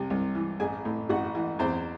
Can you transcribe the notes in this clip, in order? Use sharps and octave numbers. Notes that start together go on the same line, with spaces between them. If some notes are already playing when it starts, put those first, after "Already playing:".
Already playing: C2 C3
C2
E3
A1 G#4 G#5
A2
A1 F#4 F#5
E3
E2 C4 C5